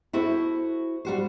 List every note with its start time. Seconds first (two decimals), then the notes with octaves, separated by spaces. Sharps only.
0.13 E4 F#4 A4 C5
1.05 G3 F#4 C5